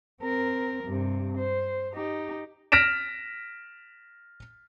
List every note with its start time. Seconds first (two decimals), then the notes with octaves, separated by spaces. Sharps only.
0.21 C4 A#4
0.85 G2 C3
1.38 C5
1.94 D#4 G4
2.72 F6 A#6 B6 D7 E7